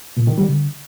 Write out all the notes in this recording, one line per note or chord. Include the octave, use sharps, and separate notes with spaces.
A#2
D#3
G3
D3